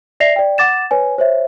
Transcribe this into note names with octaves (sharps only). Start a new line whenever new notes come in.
D5 E5 A#6 C7 F7
D5 G5
F#5 D6 A6 E7
B4 C#5 G#5
C5 C#5 E5